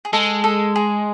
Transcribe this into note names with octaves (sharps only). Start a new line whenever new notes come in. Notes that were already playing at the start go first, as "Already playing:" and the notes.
G#4
G#3 A4
A4
G#4